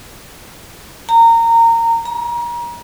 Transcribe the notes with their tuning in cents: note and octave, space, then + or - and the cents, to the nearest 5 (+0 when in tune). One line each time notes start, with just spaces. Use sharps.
A#5 -20
A#5 +35